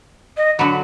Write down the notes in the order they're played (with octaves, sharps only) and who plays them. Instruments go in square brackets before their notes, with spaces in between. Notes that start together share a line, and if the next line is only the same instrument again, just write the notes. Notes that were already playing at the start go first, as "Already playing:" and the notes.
[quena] D#5
[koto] D3 F#3 [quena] B5